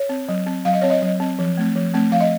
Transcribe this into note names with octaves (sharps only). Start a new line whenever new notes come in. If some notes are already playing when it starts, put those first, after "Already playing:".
Already playing: C#5
C4
F#3
C4
F#3 F5
D#5
C4 C#5
D#5
F#3
C4
F3
A3 C4
F3
A3 C4
F3 F5
D#5